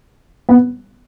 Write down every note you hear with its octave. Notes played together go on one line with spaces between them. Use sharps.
B3